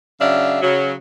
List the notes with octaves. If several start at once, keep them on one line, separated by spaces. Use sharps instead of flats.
C#3 F#3 D4 E5 F5
C#3 F#3